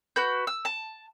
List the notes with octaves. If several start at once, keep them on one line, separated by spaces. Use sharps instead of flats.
F#4 B4 G6
E6
A5